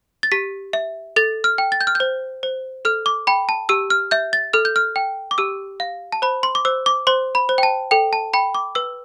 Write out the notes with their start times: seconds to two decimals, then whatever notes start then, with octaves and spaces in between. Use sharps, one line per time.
0.23 A6
0.32 G4 B6
0.73 E5
1.16 A4 A6
1.44 F6
1.58 G5
1.72 A6
1.81 G6
1.87 F6
1.95 G6
2.00 C5
2.43 C5
2.85 A4 F6
3.06 D6
3.27 G5 B5
3.49 A5
3.69 G4 E6
3.90 F6
4.11 E5 G6
4.33 A6
4.53 A4 F6
4.65 G6
4.76 F6
4.96 G5
5.31 D6
5.38 G4 E6
5.80 F5
6.12 A5
6.22 C5 B5
6.43 C6
6.55 D6
6.65 C5 E6
6.86 D6
7.07 C5 C6
7.35 B5
7.49 C5
7.58 G5
7.63 A5
7.91 A4 G5
8.13 A5
8.34 G5 B5
8.55 D6
8.75 B4 E6